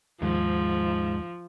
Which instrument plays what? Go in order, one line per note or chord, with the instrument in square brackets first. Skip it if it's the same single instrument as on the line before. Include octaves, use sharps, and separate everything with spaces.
[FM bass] D#2 [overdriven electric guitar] G#2 [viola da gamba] F3